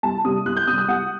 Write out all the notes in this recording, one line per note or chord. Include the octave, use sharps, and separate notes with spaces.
C2 A5
C3 G3 D#6
C2 F#6
G6
C3 G3 D#6
D#6
C2 F#5